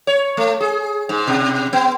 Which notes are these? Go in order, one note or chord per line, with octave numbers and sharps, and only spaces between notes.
C#5
A3
G#4
G#2
B2
B3